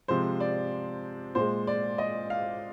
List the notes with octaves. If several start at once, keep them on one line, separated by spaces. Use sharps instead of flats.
C3 F3 G#3 C5
D5
A#2 G#3 C5
D5
D#5
F5